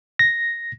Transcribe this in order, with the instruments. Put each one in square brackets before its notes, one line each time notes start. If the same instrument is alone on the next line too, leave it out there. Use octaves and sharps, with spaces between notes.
[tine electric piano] A#6